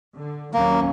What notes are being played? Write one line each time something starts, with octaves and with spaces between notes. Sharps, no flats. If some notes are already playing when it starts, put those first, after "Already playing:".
D3
D#2 F#3 A#3 C#4